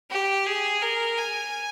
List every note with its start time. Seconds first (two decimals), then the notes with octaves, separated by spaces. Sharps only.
0.10 G4
0.46 G#4
0.82 A#4
1.17 G#5